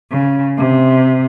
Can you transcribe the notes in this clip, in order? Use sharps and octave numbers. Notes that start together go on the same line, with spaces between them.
C#3
C3